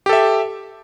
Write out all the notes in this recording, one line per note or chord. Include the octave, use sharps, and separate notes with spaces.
G4 A4 E5